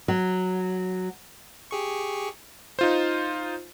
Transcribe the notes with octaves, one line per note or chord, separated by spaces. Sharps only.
F#3
G4 G#4 C#6
D#4 F4 C5